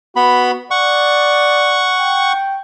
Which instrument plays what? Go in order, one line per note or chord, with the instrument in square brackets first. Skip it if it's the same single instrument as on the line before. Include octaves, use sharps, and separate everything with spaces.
[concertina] B3 B5 [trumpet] F#4
[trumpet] D5 [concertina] F#5 C#6
[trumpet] G5